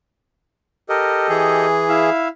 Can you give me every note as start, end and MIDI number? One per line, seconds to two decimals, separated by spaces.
0.89 1.66 67
0.89 1.66 69
0.89 1.27 70
0.89 1.66 75
1.29 2.10 52
1.29 2.10 68
1.89 2.28 64
1.89 2.28 76
1.89 2.28 77